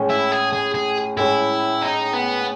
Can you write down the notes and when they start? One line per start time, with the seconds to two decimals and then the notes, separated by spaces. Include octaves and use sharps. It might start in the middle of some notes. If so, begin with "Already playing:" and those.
Already playing: A2 G#3 C#4
0.09 E4
0.32 G#4
0.53 G#4
0.74 G#4
1.17 A2 G#3 C#4 E4
1.82 D#4
2.13 B3